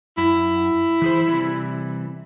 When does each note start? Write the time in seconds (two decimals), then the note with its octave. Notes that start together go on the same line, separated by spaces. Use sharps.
0.18 F#2 E4
1.02 E3 G#4 C5
1.28 C3 E3 G3